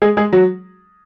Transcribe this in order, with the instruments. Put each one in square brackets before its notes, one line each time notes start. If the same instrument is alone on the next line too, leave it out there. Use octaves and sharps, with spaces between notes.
[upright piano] G#3 G#4
G#3 G#4
F#3 F#4